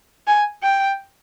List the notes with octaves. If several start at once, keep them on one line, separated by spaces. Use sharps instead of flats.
G#5
G5